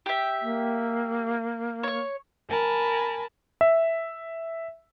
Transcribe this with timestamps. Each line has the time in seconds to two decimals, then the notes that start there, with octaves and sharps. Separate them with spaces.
0.06 G4 E5
0.42 A#3
1.83 C#5 C#6
2.50 A#4 G#5 A5 B5
3.61 E5